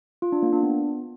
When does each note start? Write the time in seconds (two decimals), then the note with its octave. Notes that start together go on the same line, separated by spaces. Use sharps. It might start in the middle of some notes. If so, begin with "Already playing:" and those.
0.22 F4
0.32 D4
0.43 A#3
0.53 D4
0.63 B3